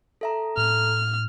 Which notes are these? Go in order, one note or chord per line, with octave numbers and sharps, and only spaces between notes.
A4 E5 A#5
A2 F6